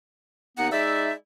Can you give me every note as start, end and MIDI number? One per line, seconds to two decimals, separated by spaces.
0.58 0.68 39
0.58 0.68 59
0.58 0.68 63
0.58 0.68 78
0.72 1.12 56
0.72 1.12 63
0.72 1.12 74
0.72 1.12 76